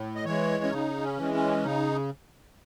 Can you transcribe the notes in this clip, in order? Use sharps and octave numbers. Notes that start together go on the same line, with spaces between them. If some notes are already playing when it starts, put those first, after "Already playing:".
Already playing: A2
D#5
E3 G#3 C#5
C#4
C#3 D#4
C#4
E3 G#3
C#4
C#3 D#4